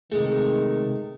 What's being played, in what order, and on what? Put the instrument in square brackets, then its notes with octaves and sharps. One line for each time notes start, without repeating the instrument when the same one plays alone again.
[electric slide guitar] C3 G#3 A3 [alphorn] D#3 [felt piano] G#4